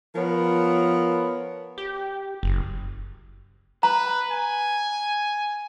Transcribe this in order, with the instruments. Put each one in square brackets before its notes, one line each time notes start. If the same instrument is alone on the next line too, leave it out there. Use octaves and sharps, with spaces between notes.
[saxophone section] F3 B3 A#4 C#5
[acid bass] G4
F#1
[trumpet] B4 [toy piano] A#5
[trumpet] G#5